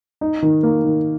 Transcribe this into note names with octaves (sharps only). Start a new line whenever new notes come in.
D#4
D#3
A#3
D#3